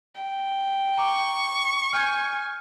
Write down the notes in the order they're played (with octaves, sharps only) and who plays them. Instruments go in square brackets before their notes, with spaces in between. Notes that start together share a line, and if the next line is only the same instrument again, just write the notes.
[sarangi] G5
[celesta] A#5 D6 [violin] C#6
[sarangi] G#5 [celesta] F6 G6 G#6